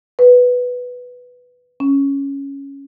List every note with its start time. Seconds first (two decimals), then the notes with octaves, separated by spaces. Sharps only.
0.19 B4
1.80 C#4